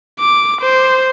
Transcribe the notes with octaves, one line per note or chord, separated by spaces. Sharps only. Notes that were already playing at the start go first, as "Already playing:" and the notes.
D6
C5